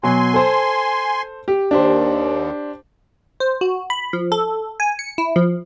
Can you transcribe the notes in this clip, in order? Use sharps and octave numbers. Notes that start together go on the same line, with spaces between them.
B2 F#3 G#5 C6
A4 C5
G4
D#2 D4 G4 C5
C5
F#4
B5
F3
A4
G#5
C#7
E4
F3